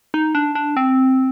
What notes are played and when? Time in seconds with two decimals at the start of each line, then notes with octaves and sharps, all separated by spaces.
0.14 D#4
0.35 D4
0.55 D4
0.77 C4